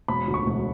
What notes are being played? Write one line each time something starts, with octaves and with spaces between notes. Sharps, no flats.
E1 B5
D2
C#6
E1